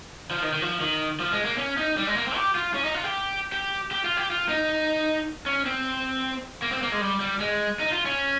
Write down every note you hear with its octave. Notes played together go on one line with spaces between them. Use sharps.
F3
D#3
D#3
F3
D#3
F3
G#3
A#3
C#4
D#4
G3
G#3
A#3
C4
G4
F4
C#4
D#4
F4
G4
G4
G4
F4
G4
F4
D#4
C#4
C4
A#3
C4
A#3
G#3
G3
G3
G#3
D#4
F4
C#4